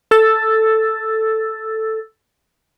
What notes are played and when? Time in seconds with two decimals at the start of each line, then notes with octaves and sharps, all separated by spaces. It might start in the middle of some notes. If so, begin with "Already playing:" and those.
0.11 A4 E6 A6